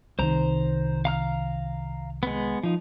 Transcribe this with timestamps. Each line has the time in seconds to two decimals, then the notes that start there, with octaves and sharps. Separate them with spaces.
0.19 C2 D#3 C5 A#5
1.05 F5 A#5 F6
2.23 G#3 B3
2.63 F3 D#4